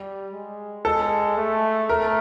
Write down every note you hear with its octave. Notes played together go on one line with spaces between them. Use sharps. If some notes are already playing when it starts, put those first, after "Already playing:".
Already playing: G3
G#3
G#3 A4
A3
A3 A#4